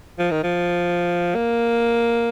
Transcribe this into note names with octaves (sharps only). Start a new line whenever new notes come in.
F3
D#3
F3
A#3